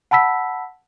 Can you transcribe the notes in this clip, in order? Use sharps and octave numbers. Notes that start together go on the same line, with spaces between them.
F#5 A5 B5 E6 B6